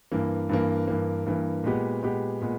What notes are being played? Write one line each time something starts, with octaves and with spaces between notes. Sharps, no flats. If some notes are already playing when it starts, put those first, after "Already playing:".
G2 E3 A#3
G2 E3 A#3
G2 E3 A#3
G2 E3 A#3
A#2 G#3 B3 G4
A#2 G#3 B3 G4
A#2 G#3 B3